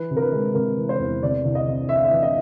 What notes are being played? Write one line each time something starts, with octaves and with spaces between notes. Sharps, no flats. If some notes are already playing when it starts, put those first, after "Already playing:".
Already playing: E3 B4
C3
A#4
B4
G#3
C3 A#4
E3
C5
E2
C3 D5
C2
D#5
C3
E3 E5
F5
E5
E3
D#5